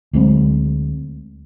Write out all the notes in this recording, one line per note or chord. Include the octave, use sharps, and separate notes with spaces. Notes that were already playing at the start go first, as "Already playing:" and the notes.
D2 F#3 G#3 C4